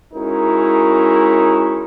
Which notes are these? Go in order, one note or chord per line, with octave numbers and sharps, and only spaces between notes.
G#3 C#4 D#4 E4 F#4 A#4